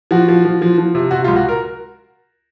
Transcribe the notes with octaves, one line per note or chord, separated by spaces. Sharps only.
F3 F#4
F3
F3
F3
F3
C3
C3 F#4
C#2 F4
F#4
A#4